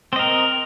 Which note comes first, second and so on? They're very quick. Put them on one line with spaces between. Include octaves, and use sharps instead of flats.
C4 D#5 A#4